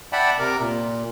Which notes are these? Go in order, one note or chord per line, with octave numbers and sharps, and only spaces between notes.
D5 E5 F#5 G5 A5 B5
C3 A#4 D6
A#2